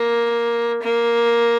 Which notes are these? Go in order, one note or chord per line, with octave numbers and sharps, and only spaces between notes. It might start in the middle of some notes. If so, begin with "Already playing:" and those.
Already playing: A#3
A#3